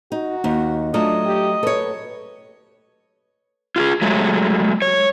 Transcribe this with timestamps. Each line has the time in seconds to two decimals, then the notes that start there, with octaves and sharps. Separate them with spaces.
0.12 D#4 F#4
0.44 D#2 D#4
0.94 F#3 A3 D4 F4 D#5
1.26 G4
1.63 A4 B4 C#5
3.76 F4 F#4 G#4
4.02 F#3 G#3 A3
4.82 C#5